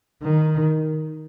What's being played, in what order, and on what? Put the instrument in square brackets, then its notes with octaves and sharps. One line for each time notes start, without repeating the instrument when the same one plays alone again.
[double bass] D#3